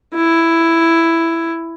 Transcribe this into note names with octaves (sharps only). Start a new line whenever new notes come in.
E4